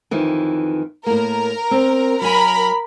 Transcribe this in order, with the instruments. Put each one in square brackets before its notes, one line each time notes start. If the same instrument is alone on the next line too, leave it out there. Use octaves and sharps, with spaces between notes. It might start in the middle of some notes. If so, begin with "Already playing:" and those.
[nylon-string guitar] F2 D#3 E3
[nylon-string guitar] A2 A#3 [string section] A#4
[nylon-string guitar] C4
[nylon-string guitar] F#3 G#5 [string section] A#4 B5